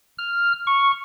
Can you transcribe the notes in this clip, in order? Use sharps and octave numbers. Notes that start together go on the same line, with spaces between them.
F6
C#6